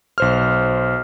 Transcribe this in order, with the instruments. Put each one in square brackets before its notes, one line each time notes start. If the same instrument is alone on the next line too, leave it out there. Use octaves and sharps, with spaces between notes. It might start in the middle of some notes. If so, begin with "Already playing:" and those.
[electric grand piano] B1 C5 F6